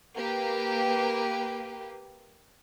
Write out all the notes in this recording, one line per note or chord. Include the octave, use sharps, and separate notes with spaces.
A#3 G4 B4